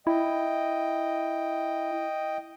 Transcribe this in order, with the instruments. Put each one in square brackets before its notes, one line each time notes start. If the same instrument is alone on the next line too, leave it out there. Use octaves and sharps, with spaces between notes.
[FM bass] E4 [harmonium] D#5 G5